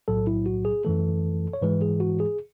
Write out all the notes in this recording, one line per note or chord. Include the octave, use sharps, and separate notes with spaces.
B1 A2 F#3 A4
E4
F#4
G#4
F#2 E3 A3 A4
C#5
G#2 E3 G#3 B4
G#4
F#4
G#4